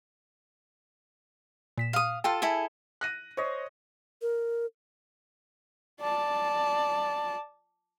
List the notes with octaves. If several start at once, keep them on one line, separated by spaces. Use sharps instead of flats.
A#2 B6 E7
F5 D#6
F4 A4 G5
E4 G#4 A4
F#6 A#6 D#7
C5 C#5 D#5
A#4
D5 A5